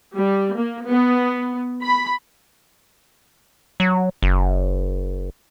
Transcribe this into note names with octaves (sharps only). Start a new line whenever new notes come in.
G3
A#3
B3
B5
F#3
F#1